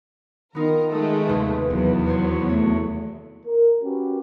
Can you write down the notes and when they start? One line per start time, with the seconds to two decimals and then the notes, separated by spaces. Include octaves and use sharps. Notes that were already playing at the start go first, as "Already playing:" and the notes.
0.55 D#3 B3 D#4 F4 A#4
0.91 G#3 A3 A4 D#6
1.26 D#2 C3 A#3 B4
1.70 E2 F#3 B3
2.07 F#4 C5 C#5
2.49 A3 C#5
3.45 A#4
3.83 C#4 F#4 G4 B4